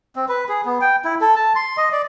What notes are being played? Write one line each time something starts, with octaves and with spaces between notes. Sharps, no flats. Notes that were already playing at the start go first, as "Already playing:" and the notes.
C4
B4
G#4
B3
G5
E4
A4
A5
C6
D#5
D5